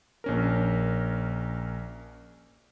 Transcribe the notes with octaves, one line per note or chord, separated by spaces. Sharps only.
A#1 C#4 A#4